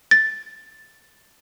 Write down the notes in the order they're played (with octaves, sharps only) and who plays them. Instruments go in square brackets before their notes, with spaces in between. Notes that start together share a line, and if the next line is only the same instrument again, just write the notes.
[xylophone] A6